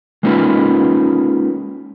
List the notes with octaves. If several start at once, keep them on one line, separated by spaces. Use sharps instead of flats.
G#3 A#3 C#4 D#4 F4 B4